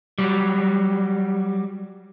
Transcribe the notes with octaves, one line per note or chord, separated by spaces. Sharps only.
F#3 G3